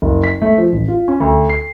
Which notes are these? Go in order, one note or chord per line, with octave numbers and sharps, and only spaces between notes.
F#1
B6
A3
F3
A1
F4
C#4
D2
C7